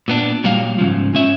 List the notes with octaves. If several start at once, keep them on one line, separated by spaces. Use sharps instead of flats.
A#2 B3 D4
A#2 F#3 G3 F5
G#2 C#3 F3
G#2 C#4 E5